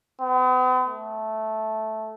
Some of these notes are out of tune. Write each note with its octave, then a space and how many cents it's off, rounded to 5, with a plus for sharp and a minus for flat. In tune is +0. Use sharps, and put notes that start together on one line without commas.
B3 +45
A3 -10